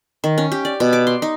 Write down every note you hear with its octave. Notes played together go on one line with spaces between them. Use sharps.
D#3
C#4
G4
D5
B2
D6
C6
D#4